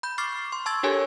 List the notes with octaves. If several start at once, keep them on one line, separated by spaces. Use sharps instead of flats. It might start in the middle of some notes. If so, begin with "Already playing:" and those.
B5 G6
C#6 D6 F6 A6 C7
C6
A5 C#6 E6 G#6 A6
D4 G4 A4 A#4 C#5 G#5